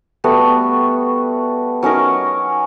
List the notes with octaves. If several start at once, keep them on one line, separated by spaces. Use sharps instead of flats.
G3 A3 B3 F#4
F#3 C#4 D#4 A#4